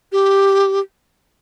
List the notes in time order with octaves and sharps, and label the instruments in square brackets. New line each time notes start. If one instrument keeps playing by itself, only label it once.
[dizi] G4